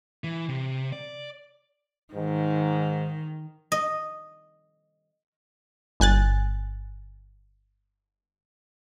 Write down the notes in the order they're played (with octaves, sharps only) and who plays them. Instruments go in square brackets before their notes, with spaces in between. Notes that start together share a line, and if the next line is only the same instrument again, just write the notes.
[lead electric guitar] E3
C3
D5
[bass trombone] G#2 [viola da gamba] D#3
[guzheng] D#5
[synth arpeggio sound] G1 G#5 F#6 A6